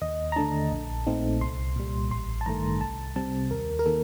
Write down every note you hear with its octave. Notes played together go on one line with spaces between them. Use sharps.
D#2 D#5
A#5
D3 A3 D4 A5
A#1
A#2 A3 C4 D#4
C2 C6
A#2 G3
A1 C6
A5
G2 D#3 A3 A#5
C2 A5
C3 G3 C4 A5
D#2 A#4
A#4
D#3 A#3 A4